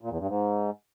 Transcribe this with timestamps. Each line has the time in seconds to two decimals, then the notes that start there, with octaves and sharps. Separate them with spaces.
0.01 A#2
0.10 E2
0.19 G2
0.28 G#2